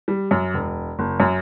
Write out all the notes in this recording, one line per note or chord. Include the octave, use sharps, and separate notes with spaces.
G3
F#2
E1
F#1
F#2